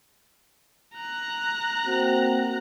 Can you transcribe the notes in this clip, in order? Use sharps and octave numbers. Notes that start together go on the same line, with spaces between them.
A#5 F#6
A#3 C4 F#4